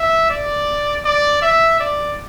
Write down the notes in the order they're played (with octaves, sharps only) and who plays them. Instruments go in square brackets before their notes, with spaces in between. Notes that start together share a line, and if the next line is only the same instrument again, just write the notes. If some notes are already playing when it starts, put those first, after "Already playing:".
Already playing: [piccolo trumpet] E5
D5
D5
E5
D5